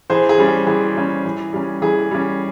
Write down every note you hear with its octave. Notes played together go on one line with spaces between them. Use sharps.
E3 G#4 C5
G#4
G3 C#4
G#4
E3 G#4
G3 C#4
E3
G3 C#4
E3 G#4
G3 C#4